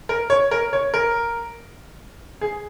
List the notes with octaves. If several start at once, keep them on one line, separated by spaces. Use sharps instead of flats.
A#4
C#5
A#4
C#5
A#4
G#4